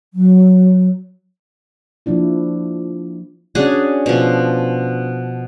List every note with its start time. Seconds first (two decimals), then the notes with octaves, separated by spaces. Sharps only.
0.14 F#3
2.06 F3 A#3 D4 E4
3.55 C#4 D4 F#4 G#4
4.06 B2 F3